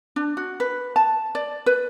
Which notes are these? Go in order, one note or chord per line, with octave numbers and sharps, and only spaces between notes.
D4
F#4
B4
A5
D5
B4